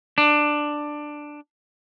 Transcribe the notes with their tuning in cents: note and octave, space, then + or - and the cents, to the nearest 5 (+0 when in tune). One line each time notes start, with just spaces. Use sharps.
D4 +10